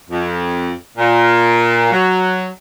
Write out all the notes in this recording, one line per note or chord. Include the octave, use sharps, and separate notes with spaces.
F2
A#2
F#3